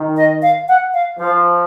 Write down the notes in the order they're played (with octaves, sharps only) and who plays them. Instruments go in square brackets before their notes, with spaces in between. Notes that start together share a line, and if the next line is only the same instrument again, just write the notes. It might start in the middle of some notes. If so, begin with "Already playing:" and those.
Already playing: [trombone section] D#3
[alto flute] D#5
F5
F#5
F5
[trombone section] F3 [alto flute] F5